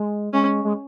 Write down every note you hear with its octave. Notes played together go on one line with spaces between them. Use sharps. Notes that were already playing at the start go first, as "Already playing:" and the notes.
Already playing: G#3
G#3 C#4
G#3